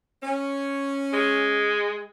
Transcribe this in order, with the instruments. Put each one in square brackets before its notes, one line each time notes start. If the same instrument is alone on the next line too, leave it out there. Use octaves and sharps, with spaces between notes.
[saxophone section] C#4
[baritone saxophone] G#3